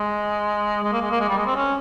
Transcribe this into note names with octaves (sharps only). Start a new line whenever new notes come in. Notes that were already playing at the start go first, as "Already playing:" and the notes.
Already playing: G#3
G#3
A#3
G#3
A#3
G#3
G3
G#3
C4
C#4